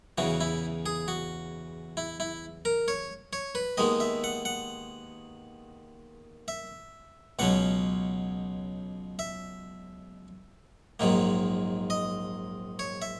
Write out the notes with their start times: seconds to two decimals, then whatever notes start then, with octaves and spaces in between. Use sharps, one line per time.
0.18 E2 C#3 E3 F#4
0.41 E4
0.86 G#4
1.08 F#4
1.97 E4
2.20 E4
2.65 A#4
2.88 C#5
3.33 C#5
3.55 B4
3.77 D#2 D#3 G#3 B3 D#5
4.00 E5
4.24 F#5
4.45 F#5
6.48 E5
7.39 C#2 B2 F#3 C#4 F#5
9.19 E5
11.00 A#1 G#2 D#3 F#3 A#3
11.90 D#5
12.79 C#5
13.02 E5